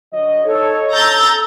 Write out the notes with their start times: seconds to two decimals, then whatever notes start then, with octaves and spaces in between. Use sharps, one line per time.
0.13 D3 F#3 D#5
0.45 D#4 A4 C#5
0.91 A4 A#5 E6 G6 A6